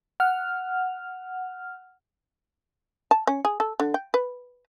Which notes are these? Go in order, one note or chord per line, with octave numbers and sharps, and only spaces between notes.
F#5 F6
A5
C#4
G#4
A4
D3
G5
B4